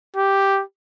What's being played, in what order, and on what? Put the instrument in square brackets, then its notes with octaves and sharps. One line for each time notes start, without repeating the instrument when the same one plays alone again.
[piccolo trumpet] G4